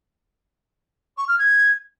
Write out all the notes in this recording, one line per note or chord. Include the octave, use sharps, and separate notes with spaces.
C#6
F6
G#6